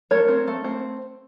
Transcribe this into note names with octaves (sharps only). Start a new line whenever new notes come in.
A3 A#4 C#5
C4
A3
C4